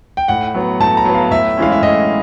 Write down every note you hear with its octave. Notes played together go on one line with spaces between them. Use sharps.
G5
A2 F#5
F#3 B3
A2 A5
A#5
F#3 B3
F5
A2 E5
E3 G#3 C#4 F5
E5
A2 D#5